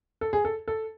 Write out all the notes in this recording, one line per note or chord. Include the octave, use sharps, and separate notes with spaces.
A4
G#4
A4
A4